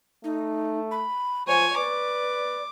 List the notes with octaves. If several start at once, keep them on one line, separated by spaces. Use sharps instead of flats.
A3 D#4
B5
F3 C5 C#5 G#5
B4 D5 D6